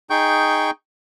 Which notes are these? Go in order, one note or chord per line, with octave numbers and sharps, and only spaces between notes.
D#4 G#4 G5 C#6 G6